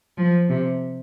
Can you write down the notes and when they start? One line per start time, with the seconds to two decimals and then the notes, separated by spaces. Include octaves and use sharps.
0.18 F3
0.49 C3